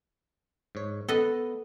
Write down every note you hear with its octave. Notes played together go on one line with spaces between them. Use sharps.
G#2 C#5
B3 A4 B4 D#5